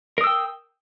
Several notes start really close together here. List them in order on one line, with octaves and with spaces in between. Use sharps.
A#4 D#6 E6 G5